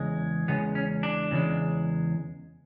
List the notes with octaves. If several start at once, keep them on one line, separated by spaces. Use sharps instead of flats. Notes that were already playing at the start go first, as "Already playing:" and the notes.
Already playing: E2 C#3 G#3
E2 C#3 G#3 B3
C#4
D4
E2 C#3 G#3